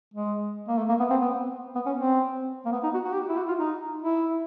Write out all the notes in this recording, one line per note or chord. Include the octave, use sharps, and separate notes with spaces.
G#3
A#3
A3
A#3
B3
C4
B3
B3
C#4
C4
A#3
B3
D#4
F#4
F#4
G4
E4
F#4
F4
D#4
E4